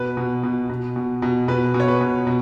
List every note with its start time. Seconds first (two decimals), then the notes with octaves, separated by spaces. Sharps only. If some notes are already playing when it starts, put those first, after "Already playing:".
Already playing: B2 B4
0.17 B2
0.43 B2
0.69 B2
0.96 B2
1.22 B2
1.48 B2 B4
1.74 B2
1.80 C#5
1.88 B4
2.01 B2
2.27 B2